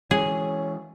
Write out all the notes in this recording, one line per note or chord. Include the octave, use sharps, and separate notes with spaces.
E3 G#3 C#4 G#4